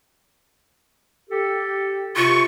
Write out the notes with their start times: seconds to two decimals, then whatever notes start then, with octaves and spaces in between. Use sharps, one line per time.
1.30 G4 A4
2.16 C3 F4 C#6